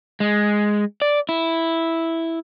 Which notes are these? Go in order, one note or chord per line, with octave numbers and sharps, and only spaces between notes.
G#3
D5
E4